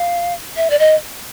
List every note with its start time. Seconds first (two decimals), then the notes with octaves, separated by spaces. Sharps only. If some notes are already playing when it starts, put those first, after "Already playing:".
Already playing: F5
0.57 E5
0.70 D5
0.79 D#5